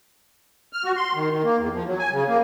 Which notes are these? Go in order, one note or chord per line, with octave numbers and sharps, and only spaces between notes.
F6
F#4
C6
D#3
D#3
A#3
E2
F3
F#3
G#5
C#3
A#3